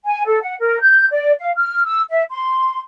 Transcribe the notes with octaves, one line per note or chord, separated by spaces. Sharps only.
G#5
A4
F#5
A#4
G6
D5
F5
F6
E6
E5
C6